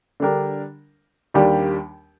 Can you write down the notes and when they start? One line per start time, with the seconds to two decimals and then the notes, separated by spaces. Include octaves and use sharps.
0.20 D3 G3 D4 G4 A#4
1.34 D#2 D#3 G3 D4 G4